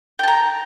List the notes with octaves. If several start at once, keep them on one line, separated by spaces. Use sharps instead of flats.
G5 A5 A#5